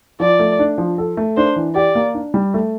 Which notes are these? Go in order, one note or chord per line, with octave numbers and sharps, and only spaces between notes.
F3 D5
A3
D4
F3
A4
A3
D4 C5
E3
G4 D5
A#3
D4
G3
A3